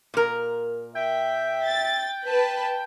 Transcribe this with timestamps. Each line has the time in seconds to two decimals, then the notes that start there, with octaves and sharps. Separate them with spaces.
0.14 A#2 A#4
0.95 E5 G5
1.65 A6
2.26 B4 A5